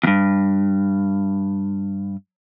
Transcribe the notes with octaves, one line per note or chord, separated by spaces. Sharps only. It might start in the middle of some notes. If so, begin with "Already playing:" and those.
E2 G2